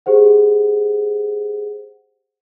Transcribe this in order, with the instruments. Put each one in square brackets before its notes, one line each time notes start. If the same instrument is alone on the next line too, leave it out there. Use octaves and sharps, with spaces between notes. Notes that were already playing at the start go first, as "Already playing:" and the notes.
[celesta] G4 G#4 C5 F#5